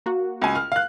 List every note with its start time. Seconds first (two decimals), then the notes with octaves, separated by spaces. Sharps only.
0.06 A#3 F#4
0.42 C#2 G#5
0.55 F6
0.72 F5 F#6